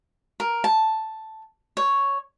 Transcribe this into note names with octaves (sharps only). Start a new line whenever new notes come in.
A#4
A5
C#5